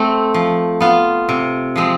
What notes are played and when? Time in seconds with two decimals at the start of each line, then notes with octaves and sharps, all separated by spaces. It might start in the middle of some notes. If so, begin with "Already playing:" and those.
Already playing: A3 C4
0.34 F3
0.80 B3 F4
1.29 C3
1.76 F3 G#3 C4